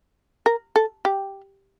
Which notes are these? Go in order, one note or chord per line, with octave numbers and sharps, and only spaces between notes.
A#4
A4
G4